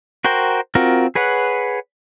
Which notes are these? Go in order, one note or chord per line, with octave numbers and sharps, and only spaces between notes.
F#4 A#4 C5 G5
C4 F4 F#4 A#4
G#4 B4 C#5 F#5